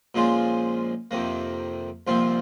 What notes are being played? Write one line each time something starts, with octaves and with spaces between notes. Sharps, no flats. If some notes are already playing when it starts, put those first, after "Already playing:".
A#2 F3 G#3 C#4 F4
F2 C3 D#3 A#3
C2 A#2 F3 C4 F4